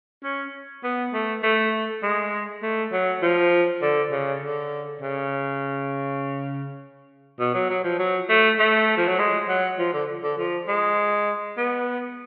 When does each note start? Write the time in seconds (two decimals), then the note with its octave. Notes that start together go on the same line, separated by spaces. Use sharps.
0.24 C#4
0.84 B3
1.13 A3
1.43 A3
2.03 G#3
2.62 A3
2.92 F#3
3.22 F3
3.82 D3
4.11 C#3
4.41 D3
5.01 C#3
7.40 B2
7.54 F#3
7.70 F#3
7.84 F3
7.99 F#3
8.29 A3
8.59 A3
8.97 F3
9.08 F#3
9.19 G#3
9.48 F#3
9.78 F3
9.93 D3
10.23 D3
10.38 F3
10.68 G#3
11.57 B3